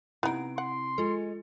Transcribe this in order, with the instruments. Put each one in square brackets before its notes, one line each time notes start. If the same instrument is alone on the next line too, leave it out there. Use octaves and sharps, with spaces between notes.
[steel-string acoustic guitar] C3 [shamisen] B3 D#4 [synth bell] E4 D7
[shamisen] F#5 [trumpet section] C6
[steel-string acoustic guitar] G#3 [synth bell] F4 A4